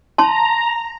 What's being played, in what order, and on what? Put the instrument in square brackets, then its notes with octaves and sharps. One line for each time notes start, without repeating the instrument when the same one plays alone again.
[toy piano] A5 C6 [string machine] A#5